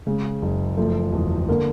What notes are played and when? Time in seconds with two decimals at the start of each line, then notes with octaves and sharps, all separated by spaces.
0.07 C#3 G#3
0.42 F#1
0.77 F3 A3
1.12 E1
1.48 D3 A#3